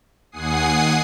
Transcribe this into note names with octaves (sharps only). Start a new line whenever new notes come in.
D#2 F#5 G#5 D#6 C7